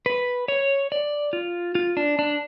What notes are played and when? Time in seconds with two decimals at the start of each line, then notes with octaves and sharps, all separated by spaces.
0.06 B4
0.48 C#5
0.92 D5
1.33 F4
1.75 F4
1.97 D4
2.19 D4